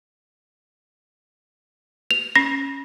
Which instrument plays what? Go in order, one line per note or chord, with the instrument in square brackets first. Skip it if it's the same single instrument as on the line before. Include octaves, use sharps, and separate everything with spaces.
[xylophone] F7
[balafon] C#4 [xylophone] A#6